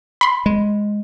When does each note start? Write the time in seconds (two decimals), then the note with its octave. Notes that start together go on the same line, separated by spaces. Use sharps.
0.21 B5 C6
0.46 G#3